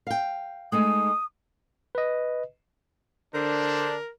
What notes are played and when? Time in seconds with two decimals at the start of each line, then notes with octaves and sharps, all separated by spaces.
0.07 F5 G5
0.72 G#3 A3 D#4 D#6
1.95 B4 D#5
3.34 D3 D4 A#4 C5